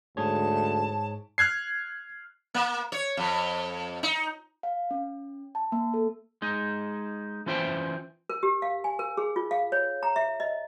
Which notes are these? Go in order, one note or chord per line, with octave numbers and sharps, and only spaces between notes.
D2 G#2 G#4 C#5 A5
F6 F#6 G#6 C7
A#3
C#5
F2
D#4
F5
C#4
A5
A#3
A4
G#3 D#4
E3 C#4 F4 C5 E5 G5
A#4
G4
F5
G#5
A#4
G#4
F4
F5
C#5
A#5
E5
D#5